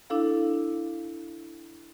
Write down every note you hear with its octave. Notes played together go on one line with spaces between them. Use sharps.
D4 E4 A4 F5